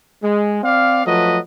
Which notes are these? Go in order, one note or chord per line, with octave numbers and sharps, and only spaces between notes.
G#3
C4 D5 F5
F3 F#3 A3 B4 D#5